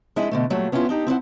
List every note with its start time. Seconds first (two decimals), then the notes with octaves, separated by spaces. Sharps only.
0.16 F2 G#3 D4 E4 E5 G#5
0.31 B2 D3 A3
0.50 A#2 F#3 G3 A3
0.72 B3 C#4 D4 E4 F4
0.89 D4 D#4 G4
1.07 C4 E4 C#5 F#5